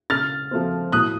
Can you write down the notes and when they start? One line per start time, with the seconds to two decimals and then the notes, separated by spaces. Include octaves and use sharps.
0.10 C#3 F6 A6
0.51 F3 A3 C4
0.92 A2 D#6 F#6